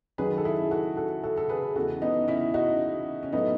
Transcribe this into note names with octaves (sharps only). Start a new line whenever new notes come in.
F#2 D#3 F#3 G#4 B4
A4
E4 G#4
F#4 A4
F#4 A4
F#4 A4
A4
G#4 B4
E2 C#3 G#3 F#4 A4
B3 D#4
C#4 E4
D#4 F#4
C#4
A2 F#3 A3 B3 D#4